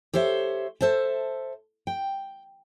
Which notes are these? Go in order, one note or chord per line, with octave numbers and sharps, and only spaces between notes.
G4 A4 C5 C#5 E5
A4 C5 E5 A5
G5